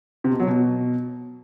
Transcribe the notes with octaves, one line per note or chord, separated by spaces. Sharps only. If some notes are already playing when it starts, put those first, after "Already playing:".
C3
B2
F#3
B2